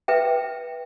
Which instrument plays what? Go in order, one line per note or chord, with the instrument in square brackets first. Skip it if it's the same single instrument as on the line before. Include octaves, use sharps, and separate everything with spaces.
[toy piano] B4 E5 G5